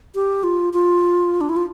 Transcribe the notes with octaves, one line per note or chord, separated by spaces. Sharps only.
G4
F4
F4
D4
E4
F4